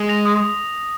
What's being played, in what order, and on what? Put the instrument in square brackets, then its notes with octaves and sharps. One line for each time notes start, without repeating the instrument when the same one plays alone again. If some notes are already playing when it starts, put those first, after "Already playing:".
Already playing: [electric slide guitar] G#3
[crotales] A#6 F7
D#6